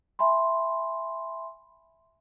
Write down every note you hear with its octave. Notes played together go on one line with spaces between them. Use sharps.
E5 G#5 B5 C6